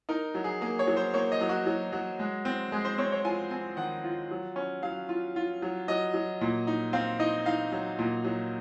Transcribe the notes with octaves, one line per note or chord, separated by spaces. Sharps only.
D#4 A#4
F#3
G#4
A#3 G#4
C#5
F#3
C5
A#3 C#5
D#5
F#3
F#4
F#3
F#3
G#3
C4
G#3 G#4
C5
C4 C#5
C#5
F4 G#5
C4 G#5
D#3 F#5
F4
F#3
C#4
F#3 F5
F4
F4
F#3
F#3 D#5
F#3
A#2
D#4
C4 F5
D#4 D#5
D#4 F5
F#3
A#2
F#3